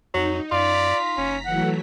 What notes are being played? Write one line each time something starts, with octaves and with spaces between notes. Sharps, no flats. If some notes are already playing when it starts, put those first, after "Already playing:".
F2 F#3 D#4
F#2 F4 D5 A#5 B6
F#1 C#4
E3 F#3 A3 F#5